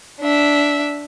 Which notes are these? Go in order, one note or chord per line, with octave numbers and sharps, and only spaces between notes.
D4 E5